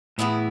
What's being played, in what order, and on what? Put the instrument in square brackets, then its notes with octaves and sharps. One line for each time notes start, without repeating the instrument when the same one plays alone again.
[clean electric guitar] A2 [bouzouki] E3 B3 E4 G#4